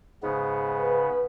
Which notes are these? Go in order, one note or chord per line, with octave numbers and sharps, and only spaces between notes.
G#2 C#3 B3
B4